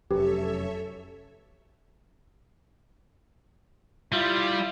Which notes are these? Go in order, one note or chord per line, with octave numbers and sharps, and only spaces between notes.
F1 F#2 G4 A4 B4 C#5 E5
G3 E4 F4